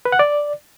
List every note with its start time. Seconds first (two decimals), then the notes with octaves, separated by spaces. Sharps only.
0.05 B4
0.12 F#5
0.19 D5